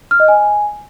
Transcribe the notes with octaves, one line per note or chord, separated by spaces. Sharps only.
F6
D#5
G#5